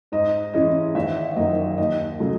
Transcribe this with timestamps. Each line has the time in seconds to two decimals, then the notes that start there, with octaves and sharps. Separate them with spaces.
0.12 G#2 D#5
0.54 E3 G#3 C#4 E4 D#5
0.95 G#1 E5
1.36 F#2 D#3 D#5
1.78 D#2 D#5
2.19 C#3 F#3 A3